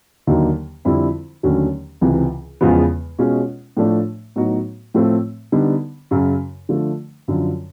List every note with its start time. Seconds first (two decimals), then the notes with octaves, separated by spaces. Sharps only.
0.27 D#2 D3 F#3 A#3 D#4
0.85 F2 D3 G3 C4 E4
1.43 D#2 D3 F#3 A3 C#4
2.01 C#2 C3 E3
2.61 E2 C#3 F3 G#3 B3
3.19 B2 G#3 C#4 F4
3.77 A2 F3 A3 D4
4.36 A2 F#3 B3 D#4 F#4
4.94 A2 F3 A3 C4
5.52 D3 G3 B3 D#4
6.11 F#2 C#3 F#3
6.69 D3 F3 A3
7.28 F#2 D3 F3